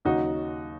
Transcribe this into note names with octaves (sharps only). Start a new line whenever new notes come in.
D#2 C#3 F#3 D#4 F#4